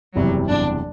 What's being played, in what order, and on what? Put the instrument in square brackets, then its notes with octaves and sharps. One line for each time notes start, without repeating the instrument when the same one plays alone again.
[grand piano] F#1 E2 C3 E3 G3 [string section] F#3
[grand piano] F#1 E2 C3 E3 G3 [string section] D4